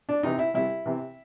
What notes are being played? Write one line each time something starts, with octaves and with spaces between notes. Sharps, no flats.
D4
C3 E3 D#4
E4
C2 E4
C3 E3